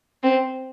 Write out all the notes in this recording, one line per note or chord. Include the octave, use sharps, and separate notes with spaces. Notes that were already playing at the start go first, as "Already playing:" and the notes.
C4